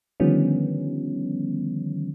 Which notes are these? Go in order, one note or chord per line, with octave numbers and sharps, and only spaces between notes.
D3 D#3 F3 G3 B3 C#4